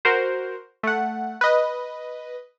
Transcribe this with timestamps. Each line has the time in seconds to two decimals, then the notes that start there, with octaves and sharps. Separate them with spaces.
0.05 F#4 A#4 C5
0.83 A3 F#5
1.41 B4 D#5